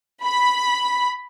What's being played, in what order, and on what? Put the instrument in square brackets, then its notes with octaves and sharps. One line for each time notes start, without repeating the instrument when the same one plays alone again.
[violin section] B5